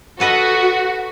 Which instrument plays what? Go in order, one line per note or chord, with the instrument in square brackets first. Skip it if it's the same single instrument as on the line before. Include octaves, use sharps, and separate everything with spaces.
[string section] F#4 [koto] A4 B4 D#5